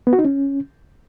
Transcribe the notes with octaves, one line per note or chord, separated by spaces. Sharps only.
B3
F#4
D#4
C#4